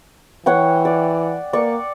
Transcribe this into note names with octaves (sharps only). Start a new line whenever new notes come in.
E3 C#5 F#5 G5
D5
A#3 D5 C#6